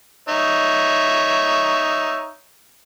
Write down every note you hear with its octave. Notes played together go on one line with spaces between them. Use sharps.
D#4 C#5 E5